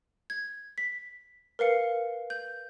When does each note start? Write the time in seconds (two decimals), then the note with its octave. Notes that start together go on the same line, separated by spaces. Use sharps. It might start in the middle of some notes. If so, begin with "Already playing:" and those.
0.30 G#6
0.78 B6
1.59 A#4 B4 F5 C#7
2.30 G6